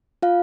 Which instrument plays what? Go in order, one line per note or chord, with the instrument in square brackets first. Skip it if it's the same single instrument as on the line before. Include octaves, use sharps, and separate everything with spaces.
[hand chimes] F4 F5